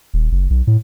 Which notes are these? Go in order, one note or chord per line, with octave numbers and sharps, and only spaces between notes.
D#1
F#1
B1
A2